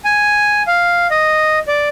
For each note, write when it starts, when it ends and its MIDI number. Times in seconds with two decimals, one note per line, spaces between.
0.05 0.63 80
0.67 1.07 77
1.11 1.59 75
1.68 1.89 74